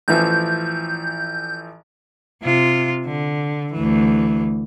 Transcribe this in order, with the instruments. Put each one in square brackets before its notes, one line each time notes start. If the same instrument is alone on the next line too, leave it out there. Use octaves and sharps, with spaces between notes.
[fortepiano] A1 E3 F3 [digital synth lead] G6
[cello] C3 F4
D3
D2 E3